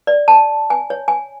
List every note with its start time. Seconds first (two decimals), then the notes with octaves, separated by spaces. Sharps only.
0.07 D5
0.28 A5
0.70 G#5
0.90 C#5
1.08 G#5